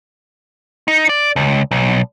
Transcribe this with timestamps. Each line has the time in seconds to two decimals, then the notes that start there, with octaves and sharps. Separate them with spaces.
0.88 D#4
1.09 D5
1.36 C#2
1.71 B1